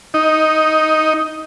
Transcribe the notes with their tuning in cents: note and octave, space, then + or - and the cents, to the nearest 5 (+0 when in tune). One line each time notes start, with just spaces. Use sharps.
D#4 +5